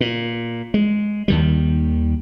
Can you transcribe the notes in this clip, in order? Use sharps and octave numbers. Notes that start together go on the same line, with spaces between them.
A#2
G#3
D#2 D#3 G3